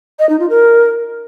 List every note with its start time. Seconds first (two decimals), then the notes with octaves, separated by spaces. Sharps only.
0.19 D#5
0.29 D#4
0.40 F4
0.50 A#4